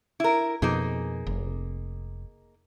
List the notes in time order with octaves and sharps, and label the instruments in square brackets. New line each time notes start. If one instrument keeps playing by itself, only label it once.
[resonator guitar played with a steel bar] E4 A#4
[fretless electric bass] F2 B2 [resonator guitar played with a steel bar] A#3 D#4 G#4
[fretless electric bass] F1